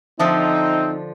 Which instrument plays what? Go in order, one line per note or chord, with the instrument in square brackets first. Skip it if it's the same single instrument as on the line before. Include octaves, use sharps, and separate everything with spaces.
[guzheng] D3 F3 D4 [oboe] C4 [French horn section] D#4 [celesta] E5 D#6